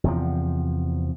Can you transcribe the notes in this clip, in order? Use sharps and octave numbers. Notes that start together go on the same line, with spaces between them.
E2 C3 F3